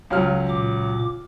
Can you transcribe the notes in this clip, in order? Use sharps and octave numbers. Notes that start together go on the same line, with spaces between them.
C#2 F#3 F6
A#2 D6